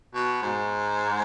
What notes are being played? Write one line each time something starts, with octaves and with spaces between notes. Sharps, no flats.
B2
G#2